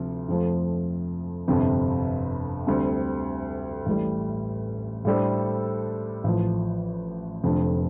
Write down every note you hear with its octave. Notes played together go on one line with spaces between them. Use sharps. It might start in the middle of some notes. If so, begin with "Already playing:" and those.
Already playing: D2 C3 F3
F2 F3 A3
G1 F2 C3
D2 D3 G3 C4
A1 A2 G3
A2 G3 D4 A4 C5
A1 A2 F3
F1 F2 D3